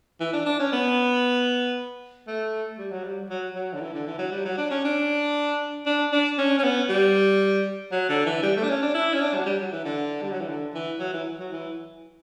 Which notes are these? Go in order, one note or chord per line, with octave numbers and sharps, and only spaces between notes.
E3
D4
D4
C#4
B3
A3
G3
F#3
G3
F#3
F#3
D3
E3
D3
E3
F#3
G3
F#3
D4
C#4
D4
D4
D4
C#4
C#4
B3
G3
F#3
D3
E3
G3
A3
D4
C#4
D4
E4
C#4
D4
F#3
G3
F#3
E3
D3
G3
F#3
E3
D3
E3
F#3
E3
F#3
E3